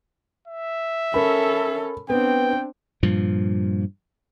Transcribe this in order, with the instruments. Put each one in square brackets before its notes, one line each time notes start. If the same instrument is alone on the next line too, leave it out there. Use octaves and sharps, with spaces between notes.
[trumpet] E5
[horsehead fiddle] C#4 A4 [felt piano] A#4 B5
[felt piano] B3 [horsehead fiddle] C4 D4 [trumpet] G5
[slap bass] G2 A#2 F3